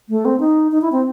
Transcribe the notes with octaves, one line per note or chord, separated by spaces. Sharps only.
A3
C4
D#4
D#4
E4
C4